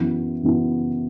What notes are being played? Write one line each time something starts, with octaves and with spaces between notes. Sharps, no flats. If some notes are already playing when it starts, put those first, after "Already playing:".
Already playing: F#2 E3 B3 E4
F#2 E3 B3 E4